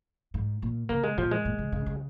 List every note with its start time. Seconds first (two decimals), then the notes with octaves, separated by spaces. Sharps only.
0.34 G#2
0.62 A#2
0.89 C#3 A#3
1.04 G#3
1.18 A#2 F3
1.31 G#3
1.45 A#2
1.59 C#3
1.72 C#3
1.86 C#3